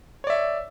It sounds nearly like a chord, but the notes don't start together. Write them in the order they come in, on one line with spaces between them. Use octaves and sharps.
C#5 D5 E5